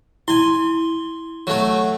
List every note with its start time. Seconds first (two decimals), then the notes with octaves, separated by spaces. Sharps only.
0.28 E4 G#5 C6
1.47 F#3 A3